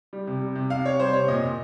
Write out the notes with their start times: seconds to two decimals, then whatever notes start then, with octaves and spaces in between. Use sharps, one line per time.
0.13 G3
0.27 C3
0.41 G3
0.55 C3
0.70 C3 F5
0.85 C3 C#5
0.99 G3 C5
1.13 C3 C#5
1.28 A#2 D#5
1.43 A#2